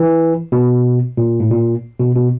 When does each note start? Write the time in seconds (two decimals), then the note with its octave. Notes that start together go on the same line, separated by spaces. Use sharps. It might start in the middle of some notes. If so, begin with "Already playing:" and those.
Already playing: E3
0.52 B2
1.17 A#2
1.40 A2
1.51 A#2
1.99 B2
2.16 B2